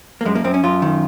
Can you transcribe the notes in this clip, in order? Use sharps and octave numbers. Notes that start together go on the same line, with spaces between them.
A#3
F#2 G#3
A#3
F#2 C4
C#4
F#2 F4
D#3